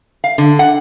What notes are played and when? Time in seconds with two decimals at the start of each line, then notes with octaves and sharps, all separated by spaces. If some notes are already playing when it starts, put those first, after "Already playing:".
0.24 F5
0.38 D3
0.59 F#5